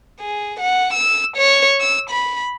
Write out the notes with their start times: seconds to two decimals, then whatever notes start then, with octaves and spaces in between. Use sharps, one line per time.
0.20 G#4
0.60 F#5
0.93 E6
1.37 C#5
1.81 E6
2.10 B5